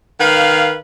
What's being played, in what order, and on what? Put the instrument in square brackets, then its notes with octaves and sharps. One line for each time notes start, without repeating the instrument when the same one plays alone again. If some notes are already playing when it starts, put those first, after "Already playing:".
[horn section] D#3 B4 F5